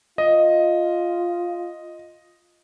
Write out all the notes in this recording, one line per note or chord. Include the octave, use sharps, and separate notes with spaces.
F4 D#5